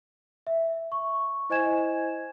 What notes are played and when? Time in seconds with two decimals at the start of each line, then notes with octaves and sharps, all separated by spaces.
0.47 E5
0.92 C#6
1.50 E4 C5 D#5 G#5 G#6 E7